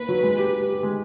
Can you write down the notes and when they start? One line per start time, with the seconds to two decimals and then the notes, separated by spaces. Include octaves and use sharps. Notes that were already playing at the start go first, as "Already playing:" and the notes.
Already playing: A#3 B4
0.09 F#3
0.23 G#3
0.38 G4
0.53 G4
0.68 G4
0.83 G#3